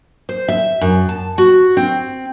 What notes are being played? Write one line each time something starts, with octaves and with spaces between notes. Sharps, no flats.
C5
E5
F#2
A5
F#4
C4